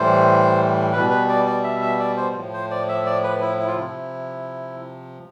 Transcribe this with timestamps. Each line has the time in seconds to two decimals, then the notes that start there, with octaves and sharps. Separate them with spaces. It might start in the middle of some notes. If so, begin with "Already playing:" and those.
Already playing: A2 E3 G3 C5
0.92 B2 G3 B4
1.10 B4
1.28 D5
1.46 D5
1.64 E5
1.81 E5
1.99 D5
2.17 C5
2.35 A2 F3
2.53 C5
2.71 D5
2.89 E5
3.06 D5
3.24 B4
3.41 E4
3.59 E4
3.67 F4
3.75 C3 F3 E4